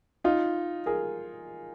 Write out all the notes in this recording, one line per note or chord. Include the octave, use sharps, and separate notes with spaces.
D#4 F4
G#4 A#4